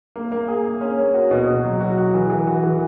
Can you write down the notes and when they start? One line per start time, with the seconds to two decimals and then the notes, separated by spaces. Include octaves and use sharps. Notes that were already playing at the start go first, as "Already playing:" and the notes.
0.16 A#3
0.32 A#3
0.48 G#4
0.65 A#3
0.81 C#4
0.99 A#3
1.14 F#4
1.31 B2
1.47 B2
1.64 F#3
1.81 F#4
1.98 F#4
2.14 E3
2.30 E3
2.47 F#4
2.63 E3